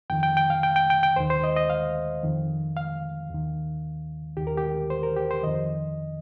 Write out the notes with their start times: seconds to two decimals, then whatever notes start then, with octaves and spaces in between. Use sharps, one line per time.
0.10 F2 D#3 G5
0.23 G5
0.37 G5
0.50 F5
0.63 G5
0.76 G5
0.90 G5
1.03 G5
1.16 D#2 D#3 C5
1.30 C5
1.44 D#5
1.57 D#5
1.70 F5
2.23 F2 D#3
2.77 F5
3.30 D#2 D#3
4.37 D#2 D#3 G4
4.47 A#4
4.57 G4
4.90 C5
5.03 A#4
5.16 G4
5.31 C5
5.43 F2 D#3 D#5